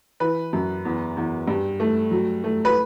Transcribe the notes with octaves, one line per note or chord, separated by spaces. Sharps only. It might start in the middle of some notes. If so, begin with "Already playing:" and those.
E3 B4
F#2
E2
E2
G2
A3
F#3
A3
B4